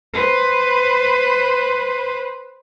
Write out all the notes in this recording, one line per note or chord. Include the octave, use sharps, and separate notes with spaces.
B4 C5